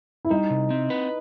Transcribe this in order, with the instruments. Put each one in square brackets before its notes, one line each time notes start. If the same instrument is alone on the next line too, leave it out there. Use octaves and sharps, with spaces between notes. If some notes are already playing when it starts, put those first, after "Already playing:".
[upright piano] E4
[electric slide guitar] G3 [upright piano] D#4
[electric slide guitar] C3
C4
B4